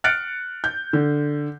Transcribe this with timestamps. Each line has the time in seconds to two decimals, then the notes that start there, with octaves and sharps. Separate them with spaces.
0.04 F6 F#6 A6 C#7 D7
0.64 G6
0.93 D3